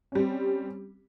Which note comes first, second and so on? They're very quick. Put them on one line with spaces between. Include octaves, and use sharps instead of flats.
C#4 G3 C4